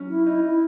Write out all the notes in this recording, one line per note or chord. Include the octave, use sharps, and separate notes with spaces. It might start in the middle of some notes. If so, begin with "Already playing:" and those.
Already playing: F#3 C#4
E4
D#4 E4
E4